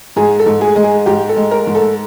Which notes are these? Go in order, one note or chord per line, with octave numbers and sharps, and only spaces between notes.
G#2 G#4
A4
G#2
G#4
G#3
G#4
G#2 G4
A4
G#3
A#4
G#2
A4